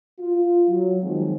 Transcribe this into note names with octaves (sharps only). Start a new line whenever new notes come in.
F4
F#3
D#3 F3 G#3 C4 D#4 C5